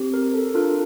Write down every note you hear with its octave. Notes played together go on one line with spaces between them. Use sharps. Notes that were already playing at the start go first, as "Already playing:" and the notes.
Already playing: C4 G4
A#4
A4
D4 F4 A4 A#4